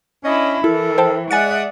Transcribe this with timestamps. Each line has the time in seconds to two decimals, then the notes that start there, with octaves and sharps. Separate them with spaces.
0.24 C#4 D4 E4 D#5
0.64 E3 E4 A4 A#4
0.98 C5 G5 A5
1.31 G#3 D5 E5 F#5 G#5 D#6 A6 C#7